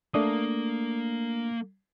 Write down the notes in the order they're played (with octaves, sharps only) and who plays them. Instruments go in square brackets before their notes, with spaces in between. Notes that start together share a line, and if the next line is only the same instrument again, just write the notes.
[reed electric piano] A3 D4 D#6 [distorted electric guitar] A#3